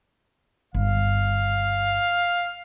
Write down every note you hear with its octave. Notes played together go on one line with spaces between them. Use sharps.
G1 F5